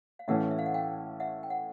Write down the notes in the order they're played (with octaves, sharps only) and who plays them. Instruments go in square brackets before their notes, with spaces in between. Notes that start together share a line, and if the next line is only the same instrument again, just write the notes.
[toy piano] F5
[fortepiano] A2 E3 A3 C#4 [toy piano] E5 F#5
[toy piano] E5
F5
F#5
F5 G5
E5 F#5
G5
F#5